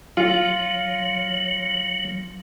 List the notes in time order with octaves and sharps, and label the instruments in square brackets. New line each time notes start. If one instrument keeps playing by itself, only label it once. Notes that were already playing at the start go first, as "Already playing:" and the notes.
[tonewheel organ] F#3 [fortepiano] F4